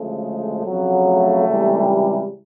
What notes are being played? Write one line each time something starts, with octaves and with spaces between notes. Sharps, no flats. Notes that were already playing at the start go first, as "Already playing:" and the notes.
Already playing: D2 C#3 F3 G#3 A3
F2 C#3 F#3
A3
C#2 C3 E3 G3